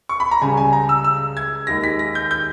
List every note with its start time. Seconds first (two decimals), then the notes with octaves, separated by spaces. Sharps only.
0.09 C#6
0.20 B5
0.31 A#5
0.42 C#2 C#3 G3 G#5
0.57 G#5
0.73 A#5
0.89 E6
1.04 E6
1.37 G#6
1.67 D#2 D#3 G#3 A#6
1.84 B6
1.99 A#6
2.15 G6
2.31 G6